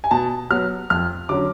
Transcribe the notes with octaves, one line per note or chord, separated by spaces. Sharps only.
G#5
B2 A5
F#3 B3 F6
F2 F6
D3 F#3 C#4 D6